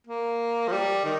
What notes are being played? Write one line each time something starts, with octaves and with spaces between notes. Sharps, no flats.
A#3
F3
G3
D#3